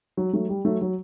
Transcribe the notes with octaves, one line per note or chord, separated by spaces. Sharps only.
F#3
F#3 A3
G3
F#3 A3
F#3